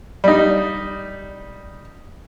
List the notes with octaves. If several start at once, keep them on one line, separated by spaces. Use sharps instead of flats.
G3 D#4